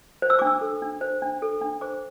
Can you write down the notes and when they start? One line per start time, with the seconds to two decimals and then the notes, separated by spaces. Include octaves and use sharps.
0.22 C5
0.30 E6
0.39 D4 D6
0.47 E6
0.61 A4
0.82 D4
1.01 C5
1.22 D4
1.42 A4
1.62 D4
1.81 C5 D6